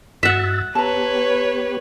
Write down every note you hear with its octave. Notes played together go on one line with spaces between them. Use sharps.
G2 F#4 E5 F#5 E6 A6
B3 G4 B4 C#5 A5 A#5